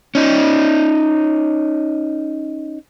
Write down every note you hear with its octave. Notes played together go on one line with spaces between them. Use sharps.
C#4 D#4